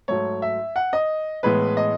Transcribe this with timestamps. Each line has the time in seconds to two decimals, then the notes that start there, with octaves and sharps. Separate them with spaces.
0.08 G#2 F#3 A3 C#5
0.42 E5
0.76 F#5
0.93 D#5
1.43 A2 E3 G#3 B3 B4
1.77 D#5